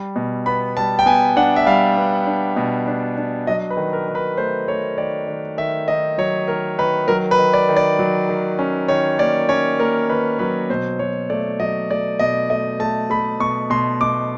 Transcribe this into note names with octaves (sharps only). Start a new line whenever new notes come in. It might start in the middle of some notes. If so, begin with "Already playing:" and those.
Already playing: G3
B2
B3 B5
G3 A5
G5
B3 G#5
D4 F#5
E5
G3 F5
B3
D4
B2
D4
D4
F#3 D#5
B4
D#3
A#4
D#3
B4
A3 C5
A3 C#5
D#3 D5
D#3
D#3 E5
D#3 D#5
F#3 C#5
D#3 A#4
D#3 B4
F#3 A#4
B4
D#3
D5
D#3
D5
F#3
D#3
C#4
D#3 C#5
A#3 D5
C#4 C#5
A#3 A#4
D#3 B4
F#3 B4
B2 C5
F#3 C#5
A3 D5
F#3 D#5
A3 D5
B2 D#5
A3 D#5
A3 A5
A3 B5
B2 C#6
B2 C6
B2 D6